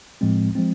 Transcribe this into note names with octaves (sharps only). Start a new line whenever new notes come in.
A2 F3 G#3 C4
F3 G#3 C4